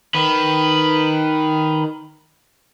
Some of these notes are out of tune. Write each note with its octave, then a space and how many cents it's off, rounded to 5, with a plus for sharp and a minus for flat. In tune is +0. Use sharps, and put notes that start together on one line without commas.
D#3 +0 B4 +5